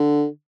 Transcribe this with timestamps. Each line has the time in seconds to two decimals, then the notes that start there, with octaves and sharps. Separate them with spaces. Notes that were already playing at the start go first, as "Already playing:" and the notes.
Already playing: D3